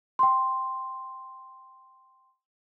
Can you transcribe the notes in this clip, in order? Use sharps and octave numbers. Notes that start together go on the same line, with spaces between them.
G5 C6